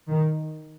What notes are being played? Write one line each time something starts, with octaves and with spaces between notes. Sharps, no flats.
D#3